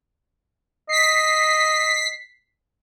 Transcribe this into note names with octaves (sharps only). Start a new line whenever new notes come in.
D#5 B6 C7